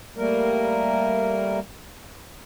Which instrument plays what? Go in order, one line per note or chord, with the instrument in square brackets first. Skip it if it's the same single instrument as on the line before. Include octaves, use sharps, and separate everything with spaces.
[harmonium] G3 A3 A#3 A#4